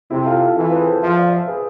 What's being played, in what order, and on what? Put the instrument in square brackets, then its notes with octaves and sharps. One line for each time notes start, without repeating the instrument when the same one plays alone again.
[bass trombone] C3 [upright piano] C4 E4
[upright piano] F4 A4
F4 A4
[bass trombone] E3 [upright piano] F4 A4
[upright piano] G#4 B4
A4 C5
[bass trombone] F3 [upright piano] C5 E5
[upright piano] D5 F5
C5 E5
G#4 B4